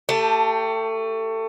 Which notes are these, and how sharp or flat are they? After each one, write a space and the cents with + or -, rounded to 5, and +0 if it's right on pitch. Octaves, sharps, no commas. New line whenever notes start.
A3 +25 G4 +0 A5 +0